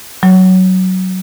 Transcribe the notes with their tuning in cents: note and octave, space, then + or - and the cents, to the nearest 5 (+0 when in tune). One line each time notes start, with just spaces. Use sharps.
F#3 +10